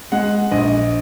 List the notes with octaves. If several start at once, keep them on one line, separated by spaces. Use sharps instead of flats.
G#3 F#5
A#1 D#5